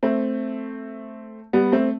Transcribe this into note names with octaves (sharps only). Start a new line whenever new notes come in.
A3 C4
G3 B3
A3 C4